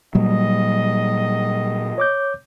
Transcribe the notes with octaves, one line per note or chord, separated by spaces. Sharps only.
A#2 F#3 G3 D#5
C#5 D6 G6